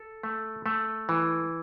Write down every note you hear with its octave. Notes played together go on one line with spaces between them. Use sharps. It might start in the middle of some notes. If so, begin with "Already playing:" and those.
Already playing: A4
A3
A3
E3